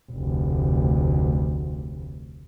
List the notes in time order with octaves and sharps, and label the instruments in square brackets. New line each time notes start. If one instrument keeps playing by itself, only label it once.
[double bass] F1 D2